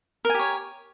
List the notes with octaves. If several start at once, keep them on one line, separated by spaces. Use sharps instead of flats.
G4 A#4 C#5 G#5